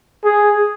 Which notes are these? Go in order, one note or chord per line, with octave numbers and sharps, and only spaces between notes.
G#4